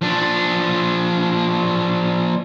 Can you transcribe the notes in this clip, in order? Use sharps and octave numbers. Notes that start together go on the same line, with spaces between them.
F3 D4